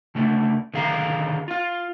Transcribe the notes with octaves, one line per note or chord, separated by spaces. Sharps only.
C#3 A3 D4
D3 D#3 G#4 F5 A5 A#5
F4 F5